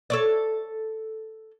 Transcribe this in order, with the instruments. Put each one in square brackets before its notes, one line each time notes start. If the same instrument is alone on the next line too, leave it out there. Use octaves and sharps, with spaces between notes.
[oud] A4 C#5 D5